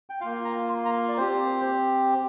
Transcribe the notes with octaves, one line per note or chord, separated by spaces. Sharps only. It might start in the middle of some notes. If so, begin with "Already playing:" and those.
G5
A#3 F4 F5
A#5
C6
A#5
D5
C4 G4 C5